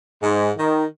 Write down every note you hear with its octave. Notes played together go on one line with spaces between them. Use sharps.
G#2
D#3